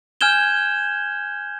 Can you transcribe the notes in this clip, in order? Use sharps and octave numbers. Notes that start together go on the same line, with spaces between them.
G#5 F6 G6 G#6 E7 G7